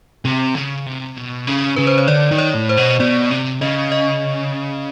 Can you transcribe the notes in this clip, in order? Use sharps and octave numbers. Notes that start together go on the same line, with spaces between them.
C3
C#3
C3
B2
C#3
C#3 B4
C5
C#5
D3 D5
D#3
C#5
A2
C5
B2
B2 D5
C3
C#3 D#5
D#5